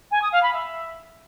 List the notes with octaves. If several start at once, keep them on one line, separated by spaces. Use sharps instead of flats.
G#5
D#6
F5
B5
E5